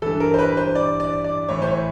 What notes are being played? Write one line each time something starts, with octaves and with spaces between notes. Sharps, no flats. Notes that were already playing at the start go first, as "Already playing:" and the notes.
G2 E3 A4
A#4
C5
B4
C5
D5
D5
D5
A2 E3 C#5
C5
C#5